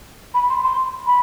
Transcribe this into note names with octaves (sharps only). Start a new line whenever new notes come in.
B5
C6
C6
B5